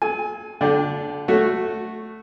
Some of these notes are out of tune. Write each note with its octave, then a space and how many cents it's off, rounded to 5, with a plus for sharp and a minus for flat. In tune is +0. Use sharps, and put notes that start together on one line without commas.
A4 -45 G#5 +0
D3 -25 D4 +0 G5 +0
A3 +0 F#4 +0 C#5 +0